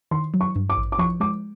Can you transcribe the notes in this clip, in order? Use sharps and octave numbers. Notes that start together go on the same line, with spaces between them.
D#3 C6
F#3
C#6
G2
D6
A1
D6
F3 C#6
G#3 D6